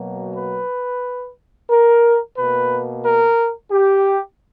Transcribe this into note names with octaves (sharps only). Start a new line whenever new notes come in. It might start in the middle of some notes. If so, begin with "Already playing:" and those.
Already playing: B2 F#3 A#3
B4
A#4
B2 A#3 B4
A#4
G4